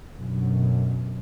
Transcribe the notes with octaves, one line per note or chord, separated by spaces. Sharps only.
F#2 B2 D3 F#3